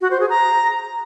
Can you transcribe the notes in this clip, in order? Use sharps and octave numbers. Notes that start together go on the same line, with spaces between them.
F#4
C5
G#4
A#5